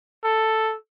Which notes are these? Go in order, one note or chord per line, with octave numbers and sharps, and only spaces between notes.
A4